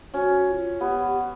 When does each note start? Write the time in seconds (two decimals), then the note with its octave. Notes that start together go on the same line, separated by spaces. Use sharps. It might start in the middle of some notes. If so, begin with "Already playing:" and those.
0.14 C#4 F#4
0.47 F#4
0.51 F4
0.80 B3 G4